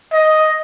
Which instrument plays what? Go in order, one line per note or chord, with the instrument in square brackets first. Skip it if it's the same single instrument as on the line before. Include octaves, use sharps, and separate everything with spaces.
[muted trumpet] D#5